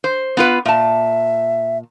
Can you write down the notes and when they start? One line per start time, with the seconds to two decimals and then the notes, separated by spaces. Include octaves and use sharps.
0.04 C5
0.37 B3 F4 B4
0.65 A#2 E5 A5